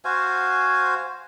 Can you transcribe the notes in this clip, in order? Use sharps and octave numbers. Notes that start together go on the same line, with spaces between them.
F#4 C5 F5 G#5